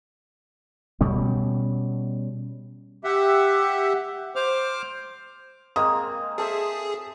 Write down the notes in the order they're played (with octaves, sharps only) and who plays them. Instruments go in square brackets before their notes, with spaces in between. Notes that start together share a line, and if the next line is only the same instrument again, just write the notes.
[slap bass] B2 G3 C#4
[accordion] G4 E5 F#5
C5 D6 F6
[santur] G#3 A#3 C4 [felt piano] D#6
[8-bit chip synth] G#4 [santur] A4 C5 E5